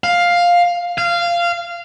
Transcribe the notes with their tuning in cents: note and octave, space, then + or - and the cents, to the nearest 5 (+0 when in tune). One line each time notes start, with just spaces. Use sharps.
F5 +5
F5 -15